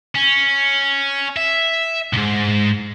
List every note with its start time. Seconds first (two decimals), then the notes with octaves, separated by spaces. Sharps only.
0.15 C#4
1.37 E5
2.13 C2 G#2